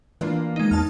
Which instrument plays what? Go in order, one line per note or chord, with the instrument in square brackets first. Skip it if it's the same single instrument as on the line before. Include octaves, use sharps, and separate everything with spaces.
[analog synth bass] E3 [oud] A#3 D4 F4
[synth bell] G#3 D#4
[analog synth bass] E2 [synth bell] A5 F6